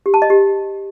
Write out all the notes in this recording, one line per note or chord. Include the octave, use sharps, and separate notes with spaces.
G4
A5
D#5
G4